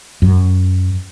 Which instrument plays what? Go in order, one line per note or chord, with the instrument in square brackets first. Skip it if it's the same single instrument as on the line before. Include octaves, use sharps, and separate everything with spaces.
[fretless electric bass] F#2